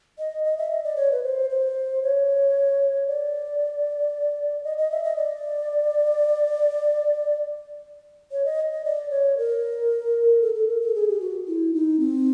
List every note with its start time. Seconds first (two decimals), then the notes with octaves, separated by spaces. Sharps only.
0.19 D#5
0.44 D#5
0.58 E5
0.71 D#5
0.84 D5
0.96 C#5
1.12 B4
1.23 C5
1.50 C5
2.03 C#5
3.07 D5
4.64 D#5
4.78 D#5
4.91 E5
5.04 D#5
5.16 D5
8.32 C#5
8.45 D#5
8.72 D#5
8.85 D5
9.10 C#5
9.38 A#4
10.42 A4
10.55 A4
10.68 A#4
10.81 A4
10.95 G#4
11.09 G4
11.20 F#4
11.47 E4
11.74 D#4
12.00 C4